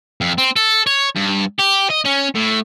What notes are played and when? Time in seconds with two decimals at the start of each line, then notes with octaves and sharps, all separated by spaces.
0.21 F2
0.38 C4
0.56 A4
0.87 C#5
1.16 G2
1.59 G4
1.90 D#5
2.05 C#4
2.35 A2